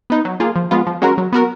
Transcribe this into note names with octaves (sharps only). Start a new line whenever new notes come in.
B3 D#4
F#3
A#3 F4 G#4
F3
G#3 B3 F4
F3
G#3 C#4 F#4 A#4
F#3
B3 F#4 A#4